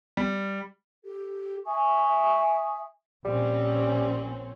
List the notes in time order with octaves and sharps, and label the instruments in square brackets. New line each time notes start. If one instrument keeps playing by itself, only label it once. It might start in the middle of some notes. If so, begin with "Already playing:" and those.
[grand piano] G3
[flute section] G4 A4
E5 G#5 C#6 D#6
[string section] A#1 C4 C#4 [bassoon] G3